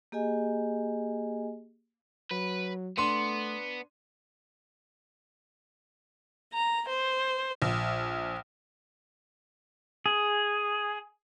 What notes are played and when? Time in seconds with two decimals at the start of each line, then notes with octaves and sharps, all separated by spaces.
0.12 A#3 G4 G#4 D#5 G#5
2.31 F#3 B4
2.98 A3 B3 D4 C6 D#7
6.52 A#5
6.88 C5
7.62 A#1
10.06 G#4